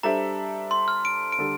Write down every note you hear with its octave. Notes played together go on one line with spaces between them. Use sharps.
G3 D4 A4 C5 E5 A#5
C6
F6
D7
D7
D3 G3 D4 A4